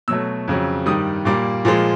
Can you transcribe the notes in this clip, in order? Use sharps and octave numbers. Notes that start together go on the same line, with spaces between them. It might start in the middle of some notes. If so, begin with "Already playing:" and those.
B2 F#3 A3 E6
F2 C#3 F#3
G2 D#3 G3 D#6
A#2 G3 A#3 D6
A#2 F3 G#3